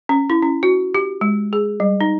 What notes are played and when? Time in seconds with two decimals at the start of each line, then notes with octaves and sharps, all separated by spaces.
0.09 C#4
0.30 E4
0.42 C#4
0.63 F#4
0.95 G4
1.21 G#3
1.53 G#4
1.80 G3
2.01 D#4